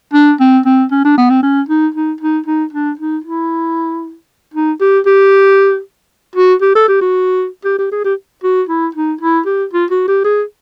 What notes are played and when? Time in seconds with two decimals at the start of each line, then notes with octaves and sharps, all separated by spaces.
0.14 D4
0.40 C4
0.66 C4
0.91 C#4
1.05 D4
1.18 B3
1.30 C4
1.43 C#4
1.69 D#4
1.95 D#4
2.21 D#4
2.47 D#4
2.73 D4
2.99 D#4
3.24 E4
4.54 D#4
4.81 G4
5.06 G4
6.36 F#4
6.62 G4
6.75 A4
6.88 G4
7.01 F#4
7.65 G4
7.78 G4
7.92 G#4
8.05 G4
8.44 F#4
8.69 E4
8.95 D#4
9.21 E4
9.46 G4
9.73 F4
9.91 F#4
10.08 G4
10.25 G#4